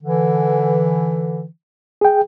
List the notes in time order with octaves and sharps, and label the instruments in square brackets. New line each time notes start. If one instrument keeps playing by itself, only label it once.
[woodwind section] D3 E3
[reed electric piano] G#4 G5